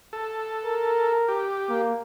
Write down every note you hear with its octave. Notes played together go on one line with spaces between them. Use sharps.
A4
A#4
G4
A#3